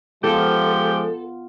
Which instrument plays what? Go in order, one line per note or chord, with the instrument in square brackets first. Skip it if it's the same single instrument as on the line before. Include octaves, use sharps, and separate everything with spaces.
[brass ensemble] F3 G#3 [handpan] B3 F4 [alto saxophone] G4 [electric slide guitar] A4